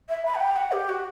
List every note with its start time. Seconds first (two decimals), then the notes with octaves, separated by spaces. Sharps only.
0.09 E5
0.26 B5
0.35 F#5
0.40 G5
0.56 F#5
0.72 G4
0.89 F#4